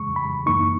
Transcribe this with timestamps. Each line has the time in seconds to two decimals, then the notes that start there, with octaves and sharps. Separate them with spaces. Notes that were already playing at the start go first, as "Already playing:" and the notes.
Already playing: C#3 E3 G#3 C#6
0.16 B5
0.46 F#2 E3 A#3 D#4 C#6